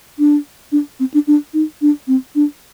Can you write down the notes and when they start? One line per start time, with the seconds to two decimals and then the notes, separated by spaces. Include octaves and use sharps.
0.19 D4
0.72 D4
1.00 C4
1.14 D4
1.27 D4
1.54 D#4
1.82 D4
2.07 C4
2.35 D4